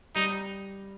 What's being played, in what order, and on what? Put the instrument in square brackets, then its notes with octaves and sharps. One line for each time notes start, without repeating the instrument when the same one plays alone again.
[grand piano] G3 [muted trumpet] D#4